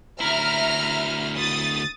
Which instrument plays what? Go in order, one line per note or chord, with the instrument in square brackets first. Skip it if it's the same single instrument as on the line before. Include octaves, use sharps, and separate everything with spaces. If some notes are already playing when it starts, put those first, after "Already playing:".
[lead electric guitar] D2 E4 [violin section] E5 A#5 F6
[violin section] D#6 A6